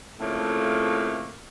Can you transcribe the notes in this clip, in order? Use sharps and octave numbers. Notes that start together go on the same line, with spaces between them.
F2 A2 C#3 A3 A#3